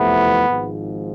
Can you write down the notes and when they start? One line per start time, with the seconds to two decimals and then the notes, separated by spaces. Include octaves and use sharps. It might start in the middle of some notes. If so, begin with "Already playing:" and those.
Already playing: F2 C3 E3 A3 B3 E4
0.46 G#1 G#2 F3